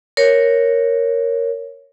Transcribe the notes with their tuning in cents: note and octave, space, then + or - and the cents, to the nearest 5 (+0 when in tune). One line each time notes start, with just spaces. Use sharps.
A#4 +0 C#5 +0